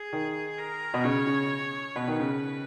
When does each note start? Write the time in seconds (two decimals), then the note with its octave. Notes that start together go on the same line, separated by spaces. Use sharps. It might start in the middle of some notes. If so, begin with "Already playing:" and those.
Already playing: G#4
0.13 D#3
0.58 A#4
0.94 B2
1.04 C#3 C#5
1.27 C#3
1.96 B2 B4
2.08 D#3
2.19 C#3